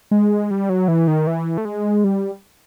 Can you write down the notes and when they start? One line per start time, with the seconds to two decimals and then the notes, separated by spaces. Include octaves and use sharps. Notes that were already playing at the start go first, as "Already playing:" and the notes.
0.11 G#3
0.51 G3
0.69 F#3
0.88 E3
1.08 D#3
1.27 E3
1.58 A3
1.65 G#3
2.04 G3